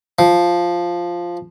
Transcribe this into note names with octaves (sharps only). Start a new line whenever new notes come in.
F3